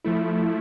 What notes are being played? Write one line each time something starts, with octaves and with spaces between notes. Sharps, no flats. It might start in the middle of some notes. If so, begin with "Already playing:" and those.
F3 A3 E4